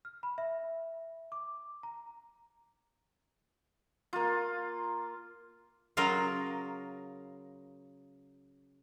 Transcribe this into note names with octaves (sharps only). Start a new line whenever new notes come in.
F6
B5
E5
D6
A#5
A#3 F4
C#3 F#3 F4 A#4